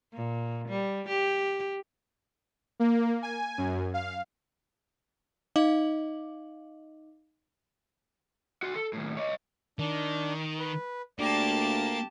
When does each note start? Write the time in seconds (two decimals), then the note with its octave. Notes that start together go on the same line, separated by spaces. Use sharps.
0.14 A#2
0.68 G3
1.08 G4
2.80 A#3
3.22 G#5
3.58 F#2
3.94 F5
5.56 D#4 D#5 F5 D6 F#7
8.63 F#4 C6
8.76 A4
8.93 D#2 A2
9.17 C#5 D#5
9.79 D#3 D4
10.59 B4
11.19 D2 A#3 G4 D5 A5